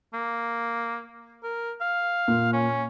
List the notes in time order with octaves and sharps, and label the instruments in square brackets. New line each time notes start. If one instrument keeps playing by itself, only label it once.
[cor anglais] A#3
A#4
F5
[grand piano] A#2
[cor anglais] C#4